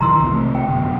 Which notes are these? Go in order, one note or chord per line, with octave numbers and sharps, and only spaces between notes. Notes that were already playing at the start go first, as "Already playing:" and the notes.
F1 D#3 E3 A#5 C6 E6
C2 B2 E3
C3 A3
G5
F#2 B2 D3
F#5